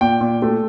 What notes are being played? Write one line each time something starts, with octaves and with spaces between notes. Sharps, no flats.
A#2 G5
A#2
A3